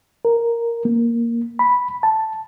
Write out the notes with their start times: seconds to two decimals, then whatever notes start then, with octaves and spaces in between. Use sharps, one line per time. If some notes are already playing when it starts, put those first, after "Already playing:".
0.25 A#4
0.85 A#3
1.59 B5
2.03 A5